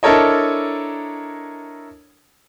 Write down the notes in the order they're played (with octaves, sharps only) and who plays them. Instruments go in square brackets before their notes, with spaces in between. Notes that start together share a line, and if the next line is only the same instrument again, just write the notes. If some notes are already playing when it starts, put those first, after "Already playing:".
[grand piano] D4 E4 A4 A#4 C#5 D#5